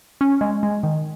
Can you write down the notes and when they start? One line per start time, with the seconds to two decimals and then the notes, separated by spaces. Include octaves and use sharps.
0.21 C#4
0.41 G#3
0.63 G#3
0.83 D#3